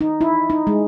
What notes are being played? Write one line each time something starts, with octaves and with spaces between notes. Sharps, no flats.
D#4
E4
D#4
G#3